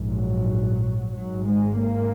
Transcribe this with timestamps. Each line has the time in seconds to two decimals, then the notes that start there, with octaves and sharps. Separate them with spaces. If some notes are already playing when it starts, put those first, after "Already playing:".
Already playing: A#1 G#2
0.10 F#3
1.12 G#1 G#2 F#3
1.47 G#3
1.82 A#3